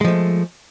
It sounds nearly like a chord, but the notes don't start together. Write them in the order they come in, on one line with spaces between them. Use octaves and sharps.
G#3 F3 A3